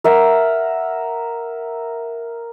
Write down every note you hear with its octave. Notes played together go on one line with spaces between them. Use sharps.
A#4 E5 F#5